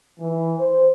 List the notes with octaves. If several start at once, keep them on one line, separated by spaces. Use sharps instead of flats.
E3
C5